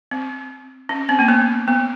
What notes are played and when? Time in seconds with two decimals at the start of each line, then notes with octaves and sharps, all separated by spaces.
0.11 C4
0.89 C#4
1.09 C4
1.19 A#3
1.28 B3
1.68 B3